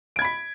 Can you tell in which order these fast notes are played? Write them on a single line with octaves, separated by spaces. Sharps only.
D7 G#6 B5 B6